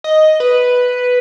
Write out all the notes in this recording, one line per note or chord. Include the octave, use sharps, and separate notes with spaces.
D#5
B4